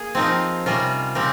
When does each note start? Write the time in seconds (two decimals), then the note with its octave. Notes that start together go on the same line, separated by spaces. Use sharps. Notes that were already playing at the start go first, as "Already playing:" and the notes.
Already playing: A#3 G#4
0.15 F3 C4 D#4 A#4
0.66 C3 G3 C#4 F4 A#4
1.15 C#3 C4 G4 A#4